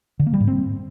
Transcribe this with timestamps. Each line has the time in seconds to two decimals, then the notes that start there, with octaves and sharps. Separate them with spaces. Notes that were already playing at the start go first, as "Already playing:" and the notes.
0.20 D3
0.26 A#3
0.33 G3
0.40 G#2
0.47 C4